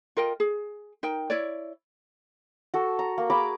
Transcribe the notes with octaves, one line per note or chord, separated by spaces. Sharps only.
F4 A#4 D#5 G5
G#4
D#4 A#4 G5
E4 C#5 D5
F#4 A4
A#5
A#3
G#4 A#5 B5 D6